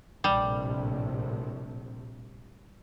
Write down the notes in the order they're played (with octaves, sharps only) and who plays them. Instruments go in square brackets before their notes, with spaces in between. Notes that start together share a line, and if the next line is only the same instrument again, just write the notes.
[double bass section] A#1 A2 C3 [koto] G3